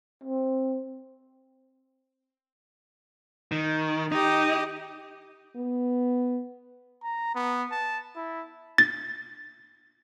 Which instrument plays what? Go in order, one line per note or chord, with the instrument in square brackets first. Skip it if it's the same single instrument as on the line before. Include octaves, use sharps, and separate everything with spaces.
[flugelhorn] C4
[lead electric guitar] D#3
[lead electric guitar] D#4 [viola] G4 D#5
[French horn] B3
[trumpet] A#5
B3
A5
E4
[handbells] A6